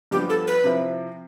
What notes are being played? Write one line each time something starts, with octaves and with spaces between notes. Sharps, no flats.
G2 F3 B3 G4
A4
B4
C3 F3 C4 E4